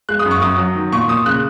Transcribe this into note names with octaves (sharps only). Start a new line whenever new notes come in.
G#3 F#6
D#6
F#2
C#6
F#2 D#6
F#3
D#3
A#2 C#6
A#2 D#6
C#3 F#6